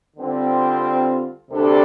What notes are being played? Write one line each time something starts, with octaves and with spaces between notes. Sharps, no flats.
D3 G3 C4 F4
D2 C3 G3 D4 A4